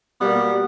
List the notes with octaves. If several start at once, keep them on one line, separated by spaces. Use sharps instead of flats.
B2 G3 A#3 B3